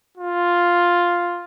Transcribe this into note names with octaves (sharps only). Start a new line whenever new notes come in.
F4